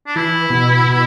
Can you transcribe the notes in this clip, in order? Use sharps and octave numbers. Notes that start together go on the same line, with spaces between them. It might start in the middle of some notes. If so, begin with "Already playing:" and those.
D4
E3 E4
B2
B2